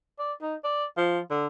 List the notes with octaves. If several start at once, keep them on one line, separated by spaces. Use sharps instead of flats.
D5
D#4
D5
F3
D3